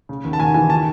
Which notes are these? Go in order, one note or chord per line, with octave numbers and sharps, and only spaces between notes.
C#3
D#2
A5
D#2 G#5
E3 G#5
D#3 A5